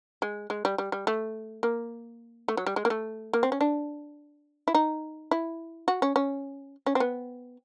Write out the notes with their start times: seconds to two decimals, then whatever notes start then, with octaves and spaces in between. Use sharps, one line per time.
0.22 G#3
0.50 G#3
0.65 G3
0.78 G3
0.92 G3
1.07 A3
1.63 A#3
2.48 A3
2.57 F#3
2.66 G3
2.76 G#3
2.85 A#3
2.90 A3
3.33 A#3
3.43 C4
3.52 C#4
3.61 D4
4.68 E4
4.75 D#4
5.31 E4
5.88 F#4
6.02 C#4
6.16 C#4
6.86 C#4
6.95 C4
7.00 B3